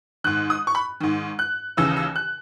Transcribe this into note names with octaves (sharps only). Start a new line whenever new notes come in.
G#2 D#3 F#6
D#6
C#6
B5
G#2 D#3
F#6
D#2 C#3 E3 E6
E6
F#6